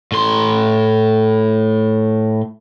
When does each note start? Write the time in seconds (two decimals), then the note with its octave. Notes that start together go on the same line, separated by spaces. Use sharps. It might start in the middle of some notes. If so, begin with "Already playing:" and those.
0.12 A2 C6